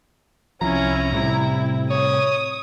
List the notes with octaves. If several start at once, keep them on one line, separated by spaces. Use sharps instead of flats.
C2 F3 C#4 E4 A#5
A2 C3 G3 E4
C#5 D#6